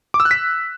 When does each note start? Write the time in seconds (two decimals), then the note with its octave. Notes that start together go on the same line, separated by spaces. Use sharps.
0.14 D6
0.20 E6
0.25 F#6
0.31 B6